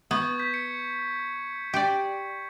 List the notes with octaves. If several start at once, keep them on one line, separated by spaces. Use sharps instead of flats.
B3 C#6 G6 G#6
G6 B6
C#7
G4 D5